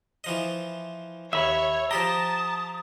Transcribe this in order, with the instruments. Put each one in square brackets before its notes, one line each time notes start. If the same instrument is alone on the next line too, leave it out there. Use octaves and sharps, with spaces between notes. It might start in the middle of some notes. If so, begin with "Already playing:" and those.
[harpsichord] E3 F3 D#5
[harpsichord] D#2 [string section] C#5 [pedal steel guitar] E5 B5
[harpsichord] F3 G4 G5 [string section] A5 [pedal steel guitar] A#5 [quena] D#6